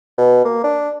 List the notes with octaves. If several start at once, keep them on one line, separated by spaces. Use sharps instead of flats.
B2
A#3
D4